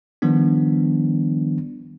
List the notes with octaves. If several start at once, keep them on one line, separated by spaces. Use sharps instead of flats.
D#3 F3 G3 B3 D4